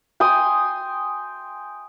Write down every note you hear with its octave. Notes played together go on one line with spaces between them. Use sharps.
G5 G#5 C6 D#6